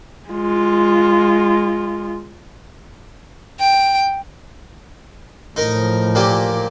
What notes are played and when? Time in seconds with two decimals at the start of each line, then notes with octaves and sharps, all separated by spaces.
0.29 G#3 F4
3.60 G5
5.56 A2 F3 D#4 A#4 A#5
6.15 A#2 A#3 G4